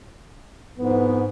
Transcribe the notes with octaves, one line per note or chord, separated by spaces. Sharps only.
C2 F2 G#2 B3